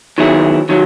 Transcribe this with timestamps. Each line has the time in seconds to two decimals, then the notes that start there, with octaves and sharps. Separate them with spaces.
0.18 D#3 F#3 B3 E4 G#4
0.69 D#3 F#3